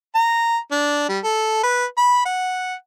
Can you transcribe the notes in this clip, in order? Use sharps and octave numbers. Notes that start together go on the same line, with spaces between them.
A#5
D4
G3
A4
B4
B5
F#5